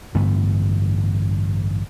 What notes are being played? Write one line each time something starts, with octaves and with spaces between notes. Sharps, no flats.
A1 G2 D3 B3